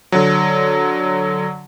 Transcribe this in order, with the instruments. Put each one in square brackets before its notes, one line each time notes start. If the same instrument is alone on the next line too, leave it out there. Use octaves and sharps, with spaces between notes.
[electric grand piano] D3 F#3